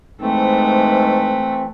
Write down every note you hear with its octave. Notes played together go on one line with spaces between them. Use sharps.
G#2 E3 A3 C4 B4